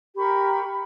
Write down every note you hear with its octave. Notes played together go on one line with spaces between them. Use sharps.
G4 A#4 B5 C#6